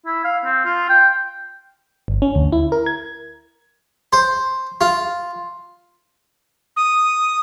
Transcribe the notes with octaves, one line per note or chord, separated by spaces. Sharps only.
E4
F5
C4
F4
G5
G1
C#4
D2
E4
A#4
G#6
C5
F4
D#6